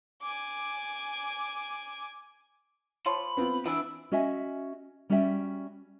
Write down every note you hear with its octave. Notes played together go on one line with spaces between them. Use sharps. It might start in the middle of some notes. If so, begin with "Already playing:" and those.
G#5 D6
F3 C5 C#5 B5
B3 C4 F4
E3 B3 D4 E4
C#4 F#4 D#5 E5 G#5
G3 C#4 F#4 D5 E5 G5